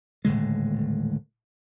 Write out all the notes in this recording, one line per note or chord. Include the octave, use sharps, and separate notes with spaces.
D#1 A2 D3 G#3